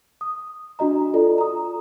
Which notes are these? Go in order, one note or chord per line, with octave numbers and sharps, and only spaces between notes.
D#6
D4 F#4 D#5 A#5
F4 A4 D5
A#5 D#6